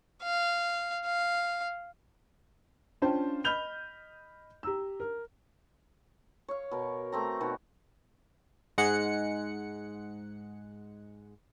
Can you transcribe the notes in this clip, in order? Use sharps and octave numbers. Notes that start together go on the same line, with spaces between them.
F5
F5
C#4 D4 F4 C5 G5 A5
D#5 B5 F6 G6 F7 G7
G4 A#5 E6
A#4
C#5 F5
B2 A#4
A3 C4 A#5
B2 D#3 F#4
G#2 G#3 F#5 C#7